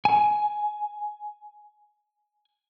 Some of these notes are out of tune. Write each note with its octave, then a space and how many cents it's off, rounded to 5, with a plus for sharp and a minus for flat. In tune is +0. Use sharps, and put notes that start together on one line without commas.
G#5 +15